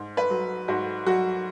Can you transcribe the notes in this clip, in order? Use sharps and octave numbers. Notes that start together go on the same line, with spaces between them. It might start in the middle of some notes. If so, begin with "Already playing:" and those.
Already playing: G#2
B4
F#3
G#2 F#4
F#3 F#4